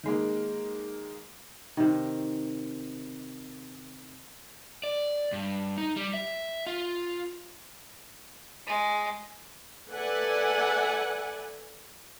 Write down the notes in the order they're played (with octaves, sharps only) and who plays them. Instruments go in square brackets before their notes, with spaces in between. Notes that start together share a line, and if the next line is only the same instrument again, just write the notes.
[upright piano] D#3 G#3 A#3
[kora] C3 D#3
[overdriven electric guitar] D5
G2
D#4
G3
E5
F4
[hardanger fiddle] G#3
[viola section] A4 B4 D5 E5 F#5 G#5